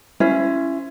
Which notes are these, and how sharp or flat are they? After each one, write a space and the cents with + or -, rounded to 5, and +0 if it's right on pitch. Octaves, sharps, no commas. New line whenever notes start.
C#4 +0 E4 +20 C5 -5